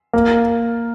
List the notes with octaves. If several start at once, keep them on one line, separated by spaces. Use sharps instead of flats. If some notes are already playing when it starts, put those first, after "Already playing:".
A#3